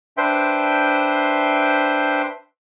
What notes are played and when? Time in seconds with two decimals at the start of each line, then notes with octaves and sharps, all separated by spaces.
0.17 D4 B4 C5 E5 G5 C6